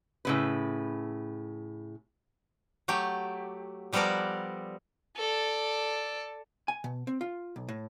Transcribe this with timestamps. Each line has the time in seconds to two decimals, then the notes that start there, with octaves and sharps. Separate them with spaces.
0.25 A2 C#3 B4
2.88 F#3 A3 G4
3.93 F3 G3 B3 A4 A#4 D5
5.16 A4 D5
6.68 G#5
6.84 B2
7.07 C4
7.21 F4
7.56 B1
7.69 A2